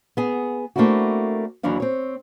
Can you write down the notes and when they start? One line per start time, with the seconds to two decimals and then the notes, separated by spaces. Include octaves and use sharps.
0.17 B3 G#4
0.76 A3 A#3 C4 D4 E4 F#4
1.63 D#2 E3 F#3 D4 F5
1.80 C4 C#5